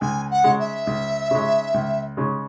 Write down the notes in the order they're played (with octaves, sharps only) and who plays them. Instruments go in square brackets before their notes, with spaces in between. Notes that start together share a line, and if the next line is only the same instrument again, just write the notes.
[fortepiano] C#2 [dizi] G#5
[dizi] F#5
[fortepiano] C#3 G#3
[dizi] E5
[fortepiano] C#2
C#3 G#3
C#2
C#3 G#3